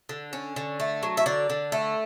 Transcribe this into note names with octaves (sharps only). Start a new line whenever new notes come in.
D3
C#4
D3
A3
F#3
E5
D3 D5
D3
A3